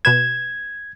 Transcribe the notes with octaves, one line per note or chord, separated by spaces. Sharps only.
B2 B4 G#6 E7